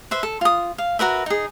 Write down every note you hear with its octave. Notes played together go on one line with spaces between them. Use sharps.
B4 C5 E5
A4
F4 D#6
F5
F#4 A#4 B4 E5
D#4 G#4